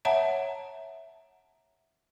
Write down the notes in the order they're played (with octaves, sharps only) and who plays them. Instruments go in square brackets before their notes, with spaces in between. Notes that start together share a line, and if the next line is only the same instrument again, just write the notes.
[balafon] C#5 E5 F#5 A5 A#5